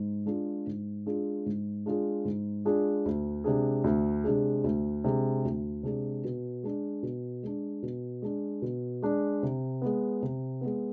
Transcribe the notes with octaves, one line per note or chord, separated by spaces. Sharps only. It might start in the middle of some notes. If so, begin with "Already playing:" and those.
Already playing: G#2
G#3 D4 F4 G#4
G#2
G#3 D4 F4 G#4
G#2
G#3 D4 F4 G#4
G#2
G#3 D4 F4 G#4
D2
C3 G#3 D4 G#4
D2
C3 G#3 D4 G#4
D2
C3 G#3 D4 G#4
D2
C3 G#3 D4 G#4
B2
G#3 D4
B2
G#3 D4
B2
G#3 D4
B2
G#3 D4
C3
G#3 B3
C3
G#3 B3